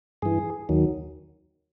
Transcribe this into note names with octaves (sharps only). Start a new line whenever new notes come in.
G2 E3 G#4
D#2 D#3 F#3